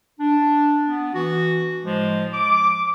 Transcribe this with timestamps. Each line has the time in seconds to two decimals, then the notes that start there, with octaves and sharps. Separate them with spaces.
0.20 D4
0.88 B3
1.14 E3 F#4
1.84 A2 F3 G#3
2.33 D6